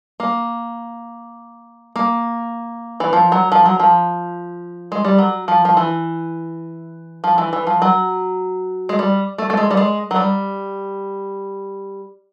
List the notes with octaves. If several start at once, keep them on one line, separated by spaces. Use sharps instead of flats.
A#3
A#3
E3
F3
F#3
F3
F#3
F3
G#3
G3
F#3
F3
F3
E3
F3
E3
E3
F3
F#3
G#3
G3
A3
A3
G#3
G3
G#3
F#3
G3